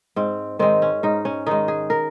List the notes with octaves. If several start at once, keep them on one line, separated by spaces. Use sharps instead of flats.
G#2 C4
D#3 G#3 C4
C#4
G#2 D#4
C#4
D#3 G#3 D#4
G#4
A#4